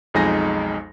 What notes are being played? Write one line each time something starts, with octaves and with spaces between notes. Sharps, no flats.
B1 F2 G#3 D#4 G#5 A#6